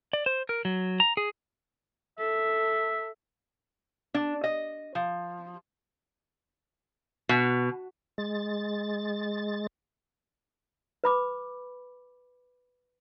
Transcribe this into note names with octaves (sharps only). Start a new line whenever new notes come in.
D5
C5
A#4
F#3
A#5
G#4
A4 E5
D4
D#5
F3
B2
G#3 A6
B4 B5 D6